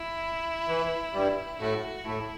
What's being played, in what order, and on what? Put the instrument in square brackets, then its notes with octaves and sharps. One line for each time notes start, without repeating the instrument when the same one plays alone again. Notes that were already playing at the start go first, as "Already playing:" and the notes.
Already playing: [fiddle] E4
[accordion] E3
G2 G3
[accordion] A2 A3 [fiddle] F#4
[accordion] A2 A3 [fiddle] E4